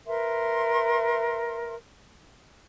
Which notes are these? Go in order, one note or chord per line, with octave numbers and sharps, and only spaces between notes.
A#4 B4 E5 C6